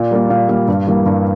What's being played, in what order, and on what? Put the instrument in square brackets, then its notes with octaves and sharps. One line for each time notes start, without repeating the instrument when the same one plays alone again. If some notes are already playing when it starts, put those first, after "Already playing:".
Already playing: [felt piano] A#2 D5
G3 A#3 A#4
A#2 F5
G3 A#3 F5
G2
E3 G3 A#3
G2